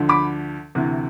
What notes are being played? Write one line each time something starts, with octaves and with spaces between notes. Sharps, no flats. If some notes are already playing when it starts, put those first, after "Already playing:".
Already playing: D2 D3 F3
B5 D6
D2 C3 E3